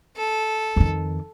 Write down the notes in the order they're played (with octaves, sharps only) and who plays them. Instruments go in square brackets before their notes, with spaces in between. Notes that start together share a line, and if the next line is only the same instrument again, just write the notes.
[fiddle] A4
[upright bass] F2 D#3